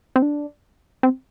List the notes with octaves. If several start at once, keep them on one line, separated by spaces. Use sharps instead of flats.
C4
D4
C4